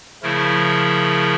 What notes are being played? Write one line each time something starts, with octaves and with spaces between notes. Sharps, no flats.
C#3 F3 A3 E4 A#4